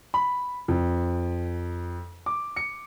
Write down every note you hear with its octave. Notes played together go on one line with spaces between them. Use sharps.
B5
F2
D6
C#7